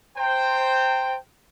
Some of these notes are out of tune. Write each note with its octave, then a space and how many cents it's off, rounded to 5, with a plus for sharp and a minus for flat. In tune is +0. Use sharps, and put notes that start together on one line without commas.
C5 +0 G5 +0 A#5 -45